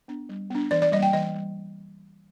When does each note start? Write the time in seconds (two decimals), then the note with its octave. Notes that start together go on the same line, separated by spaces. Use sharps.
0.08 B3 D4
0.29 G3
0.50 B3 D4
0.71 E3 D5
0.82 D5
0.92 G3 A#3 D#5
1.02 G5
1.13 E3 D#5
1.35 G3